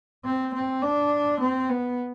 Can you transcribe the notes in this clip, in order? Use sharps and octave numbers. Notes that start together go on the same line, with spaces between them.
C4
C4
D4
C4
B3